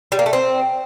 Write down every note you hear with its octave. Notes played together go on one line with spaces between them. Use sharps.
G3
A#3
A3
C4